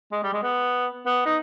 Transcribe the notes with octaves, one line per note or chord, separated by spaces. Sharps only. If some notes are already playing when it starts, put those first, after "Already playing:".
G#3
G3
G#3
B3
B3
D#4